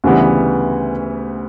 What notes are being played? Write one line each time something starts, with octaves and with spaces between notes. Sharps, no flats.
D2 C#3 E3 G3 B3